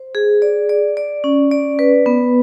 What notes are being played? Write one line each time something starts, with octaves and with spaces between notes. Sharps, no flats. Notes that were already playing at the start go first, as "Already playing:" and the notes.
Already playing: C5
G#4
D5
D5
D5
C#4
D5
B4
B3